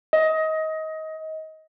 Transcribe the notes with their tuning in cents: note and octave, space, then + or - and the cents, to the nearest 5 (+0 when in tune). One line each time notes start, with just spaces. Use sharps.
D#5 +25